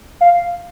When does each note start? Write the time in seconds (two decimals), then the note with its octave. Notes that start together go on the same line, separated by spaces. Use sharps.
0.21 F5